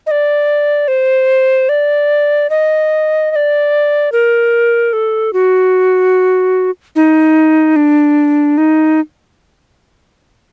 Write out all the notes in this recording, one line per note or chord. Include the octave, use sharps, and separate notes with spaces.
D#5
D5
C5
D5
D#5
D#5
D5
A#4
A4
F#4
D#4
D4
D#4